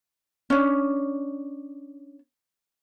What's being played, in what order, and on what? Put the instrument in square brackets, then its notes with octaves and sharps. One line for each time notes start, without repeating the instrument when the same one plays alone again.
[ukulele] C#4 D4